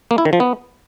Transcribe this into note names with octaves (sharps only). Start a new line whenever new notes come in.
A#3
E4
D#3
F3
B3